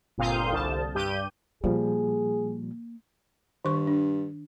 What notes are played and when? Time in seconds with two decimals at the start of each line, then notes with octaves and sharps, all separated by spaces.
0.18 G1 A#2 C4 F5 D#6 G6
0.53 C2 D3 A5
0.95 G2 G4 G6 D#7
1.64 A#2 F3 G3 A#3 G#4
3.65 G2 D#3 C#6
3.87 D4